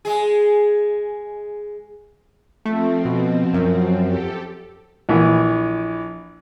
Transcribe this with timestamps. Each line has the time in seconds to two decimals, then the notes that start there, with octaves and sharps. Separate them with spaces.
0.05 G#3 G#4
2.65 F3 A3 C4
3.05 B2
3.54 F#2
4.04 G4 A4
5.09 A#1 E3